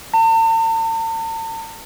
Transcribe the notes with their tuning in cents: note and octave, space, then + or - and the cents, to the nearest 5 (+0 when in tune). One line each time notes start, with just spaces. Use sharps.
A5 +45